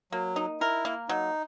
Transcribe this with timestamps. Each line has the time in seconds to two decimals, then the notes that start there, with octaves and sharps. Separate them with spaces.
0.12 F#3 A#3
0.36 D#4
0.60 E4 A#4
0.85 A#3
1.09 F#3 D#4